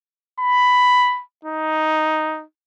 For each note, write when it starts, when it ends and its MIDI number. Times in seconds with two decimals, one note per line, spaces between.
0.40 1.22 83
1.44 2.44 63